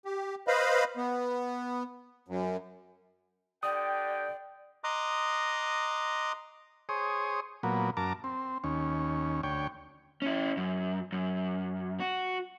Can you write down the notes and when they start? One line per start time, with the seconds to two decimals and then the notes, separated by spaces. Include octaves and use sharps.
0.05 G4
0.48 B4 C5 D#5 F5 B5
0.97 B3
2.28 F#2
3.63 D3 G4 D5 G5 D#6
4.84 D#5 A#5 C6 D6 D#6 F#6
6.89 G#4 C5 C#5 D#6
7.63 A#2 F#3 A#3 B3
7.97 F#2 A#4 A5 A#5 D6
8.24 C4
8.64 D#2 C#4
9.43 D2 C#5 G5
10.22 C#4 E4
10.57 F#2
11.12 F#2
12.00 F#4